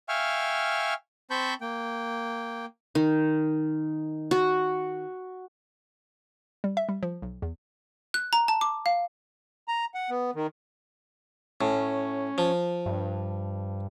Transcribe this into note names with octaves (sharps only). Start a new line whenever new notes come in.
E5 F5 G5 G#5 C#6 F6
C4 C5 A5 B5 C#6 G6
A#3 G5
D#3
F#4
G3
E5
G3
F3
B1
E2
F#6
A#5
A5
D6
F5
A#5
F#5
B3
D#3
A2 C#4
F3
G2